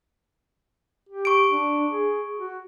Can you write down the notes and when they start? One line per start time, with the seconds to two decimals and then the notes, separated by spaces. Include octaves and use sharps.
1.09 G4
1.25 C#6 D7
1.51 D4
1.90 G#4
2.37 F#4